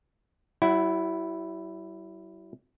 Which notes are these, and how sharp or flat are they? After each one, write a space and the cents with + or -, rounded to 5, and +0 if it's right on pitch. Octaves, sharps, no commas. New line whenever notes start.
F#3 +45 E4 +0 F#5 +20